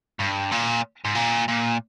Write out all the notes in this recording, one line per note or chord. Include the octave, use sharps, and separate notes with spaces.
G2
A#2
G#2
A#2
A#2